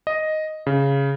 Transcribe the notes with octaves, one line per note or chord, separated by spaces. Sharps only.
D#5
C#3